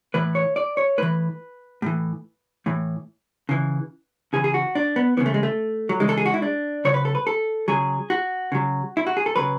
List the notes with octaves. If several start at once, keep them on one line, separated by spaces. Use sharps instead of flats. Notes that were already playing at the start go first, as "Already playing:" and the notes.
A2 E3 B4
C#5
D5
C#5
A2 E3 B4
A2 E3
A2 E3
C#3 E3
C#3 E3 G#4
G#4
F#4
D4
B3
C#3 E3 B3
A3
G#3
A3
F#3
C#3 E3 G#3
A4
G#4
F#4
E4
D4
C#3 F#3 C#5
B4
A4
B4
A4
C#3 F#3 G#4
F#4
C#3 F#3
E4
F#4
G#4
A4
C#3 F#3 B4